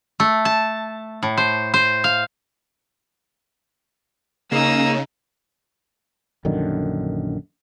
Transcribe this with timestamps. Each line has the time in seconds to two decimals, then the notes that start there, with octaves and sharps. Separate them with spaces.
0.20 A3
0.45 A5
1.23 A2
1.37 C5
1.74 C5
2.04 F5
4.52 C#3 A#3 D#4 E6
6.45 A#1 F#2 D3 D#3